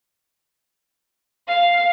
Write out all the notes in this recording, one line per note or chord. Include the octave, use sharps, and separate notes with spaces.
F5